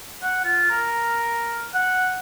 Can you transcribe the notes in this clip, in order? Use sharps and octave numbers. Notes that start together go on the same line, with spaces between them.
F#5
F4
A#4
F#5